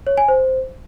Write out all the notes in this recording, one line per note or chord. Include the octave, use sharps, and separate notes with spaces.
C#5
G#5
C5